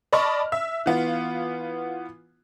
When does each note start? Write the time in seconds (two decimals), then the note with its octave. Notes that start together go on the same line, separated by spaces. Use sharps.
0.13 D5 D#5 A5 B5 C#6 F6
0.52 E5
0.86 E3 B3 F4